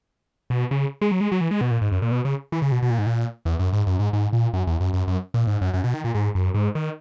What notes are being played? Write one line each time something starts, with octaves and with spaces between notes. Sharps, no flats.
B2
C#3
G#3
F#3
G#3
F#3
E3
G#3
B2
A#2
G#2
F#2
A#2
B2
C#3
E3
C#3
B2
B2
A#2
G#2
A#2
E2
F#2
G#2
F#2
G#2
G#2
A#2
F#2
E2
F#2
F#2
F#2
A#2
G#2
F#2
F#2
B2
D#3
A#2
G#2
F#2
G#2
D#3